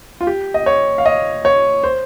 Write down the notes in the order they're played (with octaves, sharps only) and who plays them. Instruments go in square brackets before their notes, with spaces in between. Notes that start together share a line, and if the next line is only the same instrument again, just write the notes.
[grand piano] F4
G4
D#5
C#5
F5
D#5
C#5
C5